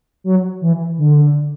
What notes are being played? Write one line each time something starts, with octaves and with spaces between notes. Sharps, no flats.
F#3
E3
D3